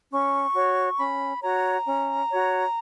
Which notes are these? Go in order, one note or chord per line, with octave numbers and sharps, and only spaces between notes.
C#4 C#6
F#4 C#5
C#4 B5
F#4 C#5 A#5
C#4
F#4 C#5